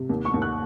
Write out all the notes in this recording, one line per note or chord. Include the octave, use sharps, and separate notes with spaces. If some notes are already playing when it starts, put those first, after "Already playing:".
Already playing: C3
D#2
C#6
D#2
F#6